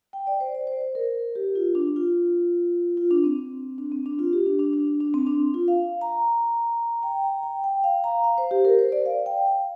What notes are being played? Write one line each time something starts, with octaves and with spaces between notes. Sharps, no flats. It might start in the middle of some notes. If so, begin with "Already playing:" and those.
G5
D5
C5
D5
C5
C5
A#4
G4
F4
D4
F4
F4
D4
C4
D4
C4
D4
F4
G4
D4
D4
D4
D4
D4
C4
D4
F4
F5
A#5
G5
A#5
G5
G5
F5
A#5
F5
C5
G4
A#4
C5
D5
F5
G5
F5